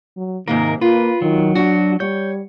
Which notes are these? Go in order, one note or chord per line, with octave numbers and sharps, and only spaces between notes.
F#3
G#2 C3 D#3 A#3 A#4
A#3 F4 B4
D#3 F#3
D4 F#4
G3 C#5 G6